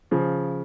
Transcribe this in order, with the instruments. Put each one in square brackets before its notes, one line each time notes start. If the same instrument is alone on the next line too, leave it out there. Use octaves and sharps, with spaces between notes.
[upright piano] C#3 F3